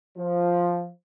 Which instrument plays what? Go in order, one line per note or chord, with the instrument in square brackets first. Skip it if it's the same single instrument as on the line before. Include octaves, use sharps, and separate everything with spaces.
[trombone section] F3